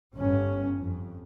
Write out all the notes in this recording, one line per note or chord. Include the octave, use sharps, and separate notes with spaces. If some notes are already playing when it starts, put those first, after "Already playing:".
G1 C#4
F2